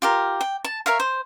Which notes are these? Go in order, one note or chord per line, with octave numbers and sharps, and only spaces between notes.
F4 G4 A#4
G5
A5
A#4 C#5 E5 F5
C5